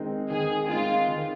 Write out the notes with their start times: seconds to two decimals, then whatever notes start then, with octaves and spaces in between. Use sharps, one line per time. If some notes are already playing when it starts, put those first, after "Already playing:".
Already playing: D#3 G#3 C4 D#4
0.30 D#3 G#4
0.68 G#3 C4 D#4 F4
1.08 D#3